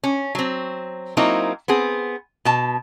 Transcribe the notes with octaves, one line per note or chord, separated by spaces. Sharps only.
C#4
F#3 C4
F#3 A#3 C4 D#4 E4
B3 C4 G#4
B2 A5